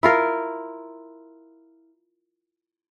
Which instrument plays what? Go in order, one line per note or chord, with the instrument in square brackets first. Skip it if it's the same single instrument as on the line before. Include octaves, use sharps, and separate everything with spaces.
[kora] E4 F4 A#4